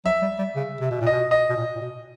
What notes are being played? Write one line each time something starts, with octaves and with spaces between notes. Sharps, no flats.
F#3 E5
G3
G3
C#3
C3
B2
A#2
B2 D#5
D#5
B2
A#2
A#2
B2